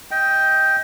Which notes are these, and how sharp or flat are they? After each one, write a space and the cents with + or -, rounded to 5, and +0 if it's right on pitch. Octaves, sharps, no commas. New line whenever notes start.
D#5 +25 G5 +0